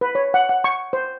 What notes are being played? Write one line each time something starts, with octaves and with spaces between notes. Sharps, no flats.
B4
C#5
F#5
F#5
C#6
C5